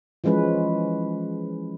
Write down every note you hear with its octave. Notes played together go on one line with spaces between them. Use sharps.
E3 F3 G#3 C#4 B4